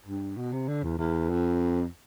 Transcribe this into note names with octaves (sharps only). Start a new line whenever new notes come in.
G2
B2
C3
D3
E2
E2
F2